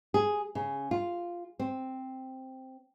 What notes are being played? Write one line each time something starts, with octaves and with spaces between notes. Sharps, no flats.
G#4
C#3
F4
C4